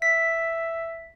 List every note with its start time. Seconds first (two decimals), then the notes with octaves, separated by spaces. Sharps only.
0.02 E5 B6